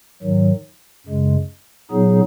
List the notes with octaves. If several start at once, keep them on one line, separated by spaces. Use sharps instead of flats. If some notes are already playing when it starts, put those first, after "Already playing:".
G#2 D#3 F#3
F#2 C#3 G#3
A#2 F#3 B3 D#4 G#4